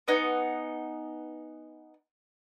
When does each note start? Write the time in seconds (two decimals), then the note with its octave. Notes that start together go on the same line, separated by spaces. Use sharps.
0.08 B3 D#4 F#5 G#5